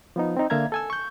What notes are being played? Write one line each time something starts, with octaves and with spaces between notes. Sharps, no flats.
F3 B3 D#4
C4 D#4
D3 A#3 E5 F5 A#5 G#6
A4 G#5 E6
C#6 G6